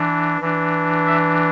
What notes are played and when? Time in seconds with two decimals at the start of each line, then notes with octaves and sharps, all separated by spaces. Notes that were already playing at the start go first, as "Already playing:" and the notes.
Already playing: E3 D4
0.41 E3 D4
1.06 E5